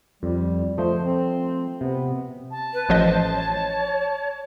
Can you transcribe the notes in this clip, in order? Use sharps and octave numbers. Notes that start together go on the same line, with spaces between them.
F2 G3
F3 A3 C5 D#5
C4
C3 B3
A5
B4
A1 F3 C5 D#5
C#5